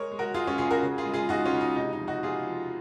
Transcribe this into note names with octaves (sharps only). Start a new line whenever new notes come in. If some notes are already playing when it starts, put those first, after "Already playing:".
Already playing: G#3 A#4 C#5
G#3
F#4 A#4
G#3 F4 G#4
C#4 F4
C#3 F4 G#4
F#4 A#4
C#3
F4 G#4
G#3
F4 G#4
G#3 D#4 F#4
C#4 F4
C#3
D#4
C3 D#4
D#4
F3
D#4 F#4
C3 F4 G#4
F3